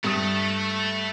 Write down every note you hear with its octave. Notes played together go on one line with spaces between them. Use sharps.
G2 A3 D#6